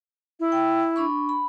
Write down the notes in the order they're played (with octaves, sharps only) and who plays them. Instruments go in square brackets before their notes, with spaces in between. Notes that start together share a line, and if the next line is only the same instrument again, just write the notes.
[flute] E4
[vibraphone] G5
D4 B5 C#6
B5